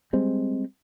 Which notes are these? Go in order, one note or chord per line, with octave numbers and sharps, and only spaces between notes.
G3 G#3 C4